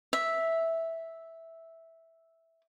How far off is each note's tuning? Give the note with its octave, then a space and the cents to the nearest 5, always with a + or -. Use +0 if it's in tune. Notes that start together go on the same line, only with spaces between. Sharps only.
E5 -5